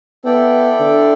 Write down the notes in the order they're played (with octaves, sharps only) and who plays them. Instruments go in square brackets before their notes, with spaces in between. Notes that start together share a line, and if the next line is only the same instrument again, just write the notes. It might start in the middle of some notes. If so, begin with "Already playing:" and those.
[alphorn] B3 [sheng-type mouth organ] E4 A4 D5 G5
[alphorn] D3